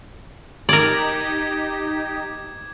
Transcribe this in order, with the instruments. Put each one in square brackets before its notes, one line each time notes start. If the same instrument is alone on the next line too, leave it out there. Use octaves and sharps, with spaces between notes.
[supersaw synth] D#4 G4 [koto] A#4 D5 [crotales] D6 G#6